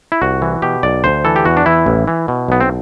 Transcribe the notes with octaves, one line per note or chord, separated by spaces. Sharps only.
E4
C2 F#4
E3
B2 G4
B1 D5
D2 C5
E3 A4
G4
E2 F#4
D4
E3 E4
A1
E3
B2
B1 B3
C4